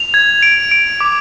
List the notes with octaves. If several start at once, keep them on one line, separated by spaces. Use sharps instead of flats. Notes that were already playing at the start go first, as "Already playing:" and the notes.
Already playing: F7
G#6
D7
D7
D6